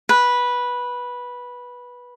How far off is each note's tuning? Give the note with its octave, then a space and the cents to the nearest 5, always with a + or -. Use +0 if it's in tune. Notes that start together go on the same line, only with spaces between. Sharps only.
B4 -10